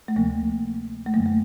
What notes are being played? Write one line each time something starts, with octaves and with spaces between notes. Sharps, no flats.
A3
D2 C3 F3 A#3
A3
F#2 D3 F#3 A#3
A3